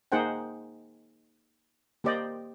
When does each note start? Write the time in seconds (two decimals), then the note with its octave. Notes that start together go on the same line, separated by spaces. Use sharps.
0.12 A#3 D#4 G#4 C5 F#5 G5
2.04 A#3 G4 C5 D5 D#5 G5